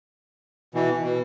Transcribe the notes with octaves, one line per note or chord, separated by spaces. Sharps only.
B2 E3
B2